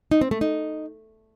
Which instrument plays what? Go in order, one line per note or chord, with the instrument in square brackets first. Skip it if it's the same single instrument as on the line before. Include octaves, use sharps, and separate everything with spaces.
[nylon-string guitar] D#4
C4
A3
D#4